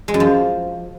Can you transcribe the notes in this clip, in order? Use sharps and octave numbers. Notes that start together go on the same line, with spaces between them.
G#3
F#2
F3